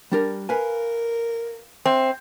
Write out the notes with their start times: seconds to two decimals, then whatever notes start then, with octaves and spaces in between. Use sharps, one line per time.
0.12 G3 D4 A#4
0.49 A#4 B4 F5 G#5
1.86 C4 E5